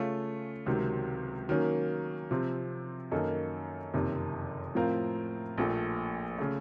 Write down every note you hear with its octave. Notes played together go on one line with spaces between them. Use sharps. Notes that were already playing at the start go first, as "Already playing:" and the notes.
Already playing: C#3 A3 C#4 F4
C#2 C3 D#3 F#3 C4
D#3 F#3 A#3 C#4
C3 F3 C4
F#2 D#3 A#3 D#4 A4
F#1 F2 C3 D#3
A2 F3 C4 F4 A#4
A#1 A#2 F3 A3
C#3 A3